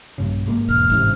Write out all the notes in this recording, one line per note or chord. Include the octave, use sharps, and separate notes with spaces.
A#1 G2 C#3
G#1 G#3 A#3
E1 F6
A1 G#2 C3